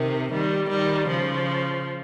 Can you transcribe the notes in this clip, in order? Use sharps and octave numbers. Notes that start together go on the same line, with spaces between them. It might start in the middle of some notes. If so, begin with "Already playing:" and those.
Already playing: C3 D#3
D#3 G3
D#3 G3
C#3 F3